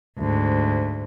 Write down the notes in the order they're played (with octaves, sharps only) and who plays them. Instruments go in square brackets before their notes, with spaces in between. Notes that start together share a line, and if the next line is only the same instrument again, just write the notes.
[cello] D2 G#2